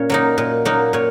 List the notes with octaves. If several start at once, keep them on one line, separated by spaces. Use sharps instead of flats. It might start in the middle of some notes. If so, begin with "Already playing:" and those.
Already playing: A#2 C#4 A#4 C#5
F#3 A#3 D#4
A#2
F#3 A#3 D#4
A#2 C#5